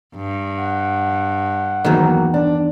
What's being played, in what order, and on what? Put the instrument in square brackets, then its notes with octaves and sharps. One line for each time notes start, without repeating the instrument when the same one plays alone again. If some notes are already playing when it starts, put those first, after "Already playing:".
[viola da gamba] G2
[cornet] F#5
[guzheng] E2 D#3 [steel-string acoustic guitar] F#3 A#3
[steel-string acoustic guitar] D4